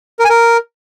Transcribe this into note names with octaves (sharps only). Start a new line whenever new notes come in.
A#4
G#5
A#4